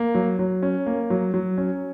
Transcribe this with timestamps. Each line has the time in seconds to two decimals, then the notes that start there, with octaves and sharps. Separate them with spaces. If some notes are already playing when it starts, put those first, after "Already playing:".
Already playing: A#3
0.15 F#3
0.39 F#3
0.63 C#4
0.86 A#3
1.10 F#3
1.34 F#3
1.58 C#4